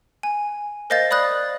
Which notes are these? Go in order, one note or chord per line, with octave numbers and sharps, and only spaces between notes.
G#5
A#4 C5 D#5 F5 G6 A6
D5 B5 D#6 F#6 A6